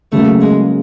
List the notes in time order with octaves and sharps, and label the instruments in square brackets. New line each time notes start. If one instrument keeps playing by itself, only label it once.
[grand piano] C#3 F#3 A#3 [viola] A3
[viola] G#3